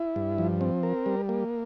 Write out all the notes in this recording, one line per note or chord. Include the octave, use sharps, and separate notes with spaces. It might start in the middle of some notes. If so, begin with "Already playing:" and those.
Already playing: E4
G2
F3
C4
A#4
G3
A#3